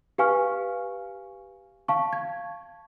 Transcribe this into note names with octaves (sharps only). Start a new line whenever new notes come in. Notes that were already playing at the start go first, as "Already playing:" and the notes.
G4 B4 F5 G#5 C#6 F6
F5 A5 C#6
G#6